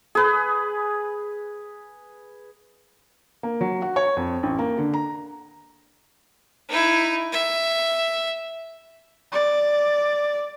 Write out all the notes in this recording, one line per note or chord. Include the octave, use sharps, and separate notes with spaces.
G#4 B4
A#3
F#3
F#4
C#5
F2
A1
A#3
D3
A#5
D#4 E4
E5
D5